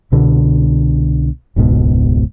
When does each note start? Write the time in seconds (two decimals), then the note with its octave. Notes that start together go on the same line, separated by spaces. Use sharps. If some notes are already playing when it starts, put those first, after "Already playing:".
0.12 C2 B2 D3
1.56 E1 C#2 G#2 B2